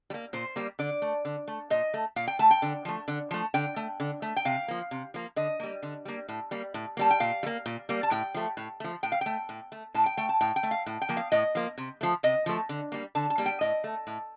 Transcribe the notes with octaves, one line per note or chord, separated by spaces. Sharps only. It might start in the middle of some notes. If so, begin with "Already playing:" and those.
G3
A#3
A#2 C5
G3 A#3
D3 D5
A3
D3
A3
A#2 D#5
A3
A#2 F5
G5
A3 A5
G5
D3
F3 A3
D3
F3 A3
D3 G5
A3
D3
A3
G5
C3 F5
F3 A#3
C3
F3 A#3
D3 D#5
G3 A#3
D3
G3 A#3
A2
G3 A#3
A2
G3 A#3 A5
G5
A#2 F5
G3
A#3
A#2
G3 A#3
A5
A2 G5
F3 A3
A2
F3 A3
A2 G5
F5
A3 G5
A2
A3
A2 A5
G5
A3 G5
A5
A2 G5
G5
A3
F5
A2
G5
F3 A#3
F5
A2 D#5
F3 A#3
C3
F3 A3
C3 D#5
F3 A3
D3
G3 A#3
D3 A5
A5
G3 A#3
G5
A2 D#5
A3
A2